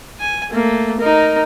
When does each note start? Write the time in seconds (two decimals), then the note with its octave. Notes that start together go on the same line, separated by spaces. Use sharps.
0.20 G#5
0.52 A3 A#3
1.00 D#4 A#4